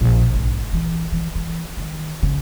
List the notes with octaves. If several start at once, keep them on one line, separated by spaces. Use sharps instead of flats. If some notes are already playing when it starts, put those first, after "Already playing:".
A#1
G#1
E3
E3
E3
D#3
C#3